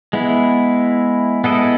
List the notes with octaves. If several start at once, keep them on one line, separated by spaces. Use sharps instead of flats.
G#3 B3 E4
G#3 B3 E4 A4 D#5